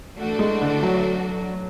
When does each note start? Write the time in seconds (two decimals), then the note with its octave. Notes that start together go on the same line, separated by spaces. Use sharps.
0.18 E3 A3 D4 F#4 A4
0.39 G#3
0.61 D3
0.83 F#3